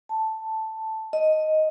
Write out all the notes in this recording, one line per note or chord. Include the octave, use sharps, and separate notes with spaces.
A5
D#5